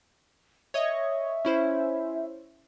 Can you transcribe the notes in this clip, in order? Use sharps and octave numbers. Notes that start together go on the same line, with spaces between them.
C#5 D#5 E5
C#4 E4 C5